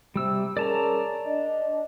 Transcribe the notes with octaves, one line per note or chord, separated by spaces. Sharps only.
C3 G3 E6
C#4 G#4 A#4 D5 A5 A#5
D4 D#5